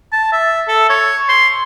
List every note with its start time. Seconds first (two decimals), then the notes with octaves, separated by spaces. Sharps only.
0.13 A5
0.32 E5
0.68 A4
0.90 C#5
1.29 C6